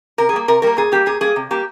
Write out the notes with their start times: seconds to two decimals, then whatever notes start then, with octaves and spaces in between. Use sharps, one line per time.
0.18 C3 A#4
0.29 G#4
0.33 G3 A#3
0.48 C3 A#4
0.62 G3 A#3 A#4
0.77 A#2 G#4
0.92 G3 A#3 G4
1.06 A#2 G#4
1.21 G3 A#3 G#4
1.36 C3
1.51 G3 A#3 G4